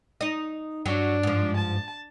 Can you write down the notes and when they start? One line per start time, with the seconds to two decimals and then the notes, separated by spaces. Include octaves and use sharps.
0.21 D#4 D#5
0.86 G2 F#3 D4
1.23 G#2 F3
1.57 A5